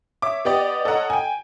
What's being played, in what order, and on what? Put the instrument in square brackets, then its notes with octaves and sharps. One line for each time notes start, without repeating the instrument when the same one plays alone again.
[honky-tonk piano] C#5 E5 D6
B3 G4 D5 D#5
A4 C#5 D#5 F#5 A#5
G5 G#5